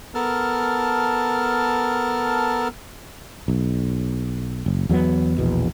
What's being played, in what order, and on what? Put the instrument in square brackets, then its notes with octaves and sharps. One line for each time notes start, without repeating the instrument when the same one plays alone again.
[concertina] B3 A4 A#4 A5 F6
[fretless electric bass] B1
F#1
E2 F#3 G#3 B3
A#1 E2 B2